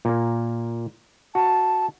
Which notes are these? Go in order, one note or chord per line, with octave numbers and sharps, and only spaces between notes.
A#2 A#3
F#4 A5